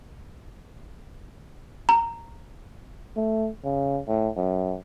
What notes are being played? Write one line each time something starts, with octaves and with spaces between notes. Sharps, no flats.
A#5
A3
C#3
A2
F#2